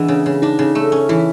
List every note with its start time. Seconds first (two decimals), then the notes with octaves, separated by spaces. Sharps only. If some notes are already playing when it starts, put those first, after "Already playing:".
Already playing: E3 G#3 B3 D4
0.08 C#3
0.26 C#3
0.42 D4 D#4
0.59 C#3
0.75 A3
0.92 C#4
1.09 E3 E4